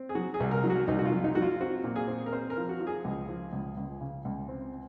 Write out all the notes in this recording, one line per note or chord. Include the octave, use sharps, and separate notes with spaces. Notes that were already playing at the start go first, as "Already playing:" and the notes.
Already playing: C4
G#4
F#3 F#4
G#4
C2
A#4
F#3
F#4
C2 D#4
F#4
F4
F#3
D#4
F#3 F#4
F4
C4 F#4
A#2
G#4
C4
A#4
C4 C5
A#4
F3
F#4
F3
G#4
C#2
F3
C#2
C#2
C#3
C#2
C4